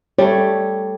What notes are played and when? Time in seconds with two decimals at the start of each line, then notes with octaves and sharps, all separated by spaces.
0.19 G3 A3 C#5